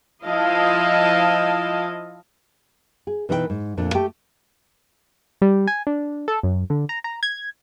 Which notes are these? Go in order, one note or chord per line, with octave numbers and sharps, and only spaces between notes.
F3 E4 D#5 F5 A5
G#4
B2 E3 D#4 B4 C#5 G5
G#2
F2 A#2 A3 D4
A3 G4 G5 A5
G3
G#5
D4
A4
F#2
D3
A#5
A#5
G#6